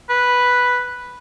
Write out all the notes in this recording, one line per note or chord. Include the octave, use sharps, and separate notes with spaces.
B4